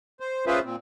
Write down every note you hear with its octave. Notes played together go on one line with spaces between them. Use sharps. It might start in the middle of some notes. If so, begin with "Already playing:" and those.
C5
C#4 F4 G#4 B4 C5 E5
A#2 C4